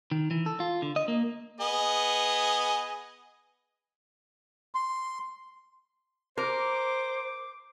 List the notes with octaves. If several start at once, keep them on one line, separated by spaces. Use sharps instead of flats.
D#3
E3
A4
F4
D3
D#5
A#3
B3 G#4 D#5
C6
A#4 C5 D6